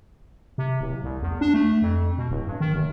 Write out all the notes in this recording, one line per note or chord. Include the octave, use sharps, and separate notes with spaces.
C3
D1
C2
E2
D4
A3
F2
B2
D1
G2
D#3
F1